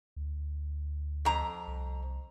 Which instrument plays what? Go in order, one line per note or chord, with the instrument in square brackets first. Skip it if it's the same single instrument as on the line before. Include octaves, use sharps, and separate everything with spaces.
[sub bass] D2
[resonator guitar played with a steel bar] F2 A#5
[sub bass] C2